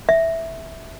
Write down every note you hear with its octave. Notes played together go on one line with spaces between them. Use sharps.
E5